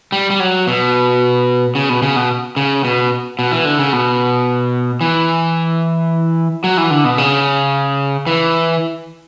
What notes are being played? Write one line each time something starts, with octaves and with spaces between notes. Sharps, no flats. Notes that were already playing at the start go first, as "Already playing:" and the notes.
G3
G3
F#3
B2
C#3
B2
C#3
B2
C#3
B2
B2
E3
D3
C#3
B2
E3
F#3
E3
D3
B2
C#3
E3